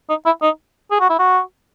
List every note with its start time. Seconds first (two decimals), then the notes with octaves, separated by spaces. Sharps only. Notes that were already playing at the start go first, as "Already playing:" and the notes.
0.10 D#4
0.26 E4
0.42 D#4
0.91 G#4
1.00 F#4
1.10 E4
1.19 F#4